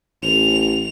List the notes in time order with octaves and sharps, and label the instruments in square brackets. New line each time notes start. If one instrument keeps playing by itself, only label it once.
[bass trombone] A1 [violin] F7